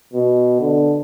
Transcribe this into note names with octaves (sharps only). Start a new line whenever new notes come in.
B2
D3